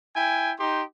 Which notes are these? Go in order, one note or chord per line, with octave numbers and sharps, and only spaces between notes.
E4 G5 G#5
D#4 G4 C6